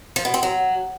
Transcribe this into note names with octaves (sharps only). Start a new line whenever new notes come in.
F3
B2
C4
F#3